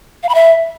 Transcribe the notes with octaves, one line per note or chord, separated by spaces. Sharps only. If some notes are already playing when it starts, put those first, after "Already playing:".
F5
B5
E5